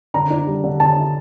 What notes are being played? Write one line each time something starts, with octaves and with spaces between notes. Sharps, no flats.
D3 A#5
D4
G3
D3
D3 A5
D4